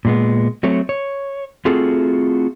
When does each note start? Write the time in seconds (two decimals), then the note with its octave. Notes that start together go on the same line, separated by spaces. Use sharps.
0.05 A#2 G#3 B3
0.63 F#3 A3 C4 C#5
0.89 C#5
1.65 A3 C4 F4 F#4 G#4 A4